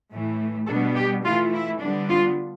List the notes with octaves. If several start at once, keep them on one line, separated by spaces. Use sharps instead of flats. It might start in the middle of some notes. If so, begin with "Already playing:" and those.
A2 E3 A3
B2 G3 B3 D4 A4
G4
E3 A3 E4 F4
E4
D3 G3 B3 D4
F4